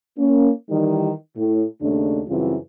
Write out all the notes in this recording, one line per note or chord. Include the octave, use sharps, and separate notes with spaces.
A#3 C#4
D#3 E3 G3
A2
D#2 C#3 A3 D4
F#2 C#3 E3 G3 C4 F4